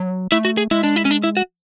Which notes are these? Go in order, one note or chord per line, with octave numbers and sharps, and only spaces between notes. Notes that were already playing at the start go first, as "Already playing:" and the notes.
Already playing: F#3
A3 E4
F#4
G#4
G#3 E4
D4
E4
C#4
D4
E4
F#4